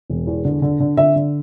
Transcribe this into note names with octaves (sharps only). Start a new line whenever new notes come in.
E1
E2
D3
D3
D3
D3 E5
D3